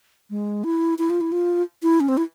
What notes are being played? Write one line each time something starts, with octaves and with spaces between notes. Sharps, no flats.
G#3
E4
E4
F4
E4
F4
E4
C#4
C4
E4